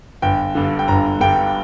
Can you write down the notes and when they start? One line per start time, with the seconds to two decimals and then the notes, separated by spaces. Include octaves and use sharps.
0.22 G1 G5
0.55 G2 D3
0.79 G5
0.88 G1 A#5
1.20 G2 D3 G5